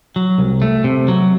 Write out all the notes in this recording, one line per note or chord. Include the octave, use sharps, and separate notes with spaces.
F#3
C2
A3
C3
F#3